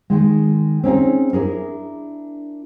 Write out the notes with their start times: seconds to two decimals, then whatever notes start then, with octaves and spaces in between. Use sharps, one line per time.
0.10 D#3 G#3
0.83 C4 C#4 D#4 G#4
1.33 D4 E4 G#4 A#4